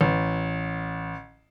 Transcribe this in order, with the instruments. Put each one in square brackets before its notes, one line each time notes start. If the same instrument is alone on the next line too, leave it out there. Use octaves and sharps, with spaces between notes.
[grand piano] A1